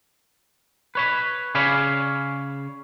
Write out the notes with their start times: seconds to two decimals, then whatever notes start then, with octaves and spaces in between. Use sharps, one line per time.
0.95 B4 C#5 B5
1.55 C#3 G#4 C#5 D5 F5 B5